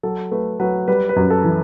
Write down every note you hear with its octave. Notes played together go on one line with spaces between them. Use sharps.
F#3 A4
A3 B4
F#3 B4
G3 B4
B4
F#2
A4
E3